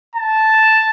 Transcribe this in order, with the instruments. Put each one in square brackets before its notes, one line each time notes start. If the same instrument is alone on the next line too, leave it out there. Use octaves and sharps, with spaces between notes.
[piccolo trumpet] A5